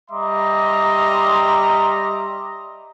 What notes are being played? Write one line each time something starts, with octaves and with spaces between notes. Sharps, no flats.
G3 D#5 E5 A#5 C6 D6